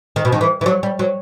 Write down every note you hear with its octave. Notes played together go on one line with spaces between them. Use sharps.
D#3
B2
D#3
E3
E3
F#3
G3
F#3